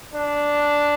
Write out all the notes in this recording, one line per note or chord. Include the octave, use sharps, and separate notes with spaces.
D4